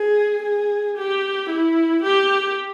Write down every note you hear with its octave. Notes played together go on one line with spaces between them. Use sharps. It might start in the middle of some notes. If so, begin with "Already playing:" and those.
Already playing: G#4
G#4
G4
E4
G4